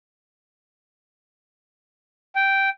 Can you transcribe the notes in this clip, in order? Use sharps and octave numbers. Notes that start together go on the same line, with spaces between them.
G5